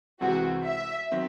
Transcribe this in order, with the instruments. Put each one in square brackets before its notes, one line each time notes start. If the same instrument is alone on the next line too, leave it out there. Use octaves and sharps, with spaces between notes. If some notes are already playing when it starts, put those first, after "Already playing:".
[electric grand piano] C2 C3 E3 G#3 C4 [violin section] F#4
[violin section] E5
[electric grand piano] D#3 F#3 C4